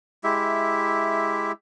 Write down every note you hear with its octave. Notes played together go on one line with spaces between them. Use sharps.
G#3 E4 G4 E5